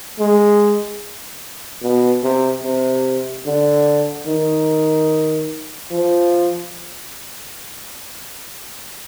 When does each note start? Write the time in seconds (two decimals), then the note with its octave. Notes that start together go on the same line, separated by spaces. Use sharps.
0.19 G#3
1.82 B2
2.23 C3
2.64 C3
3.46 D3
4.27 D#3
5.91 F3